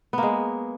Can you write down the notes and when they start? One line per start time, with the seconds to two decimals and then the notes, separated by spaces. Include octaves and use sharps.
0.13 B3
0.18 A#3
0.23 G#3